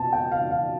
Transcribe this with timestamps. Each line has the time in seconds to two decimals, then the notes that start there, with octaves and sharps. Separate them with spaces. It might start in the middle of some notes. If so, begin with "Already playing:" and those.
Already playing: B2 A5
0.13 G5
0.31 F5
0.51 F5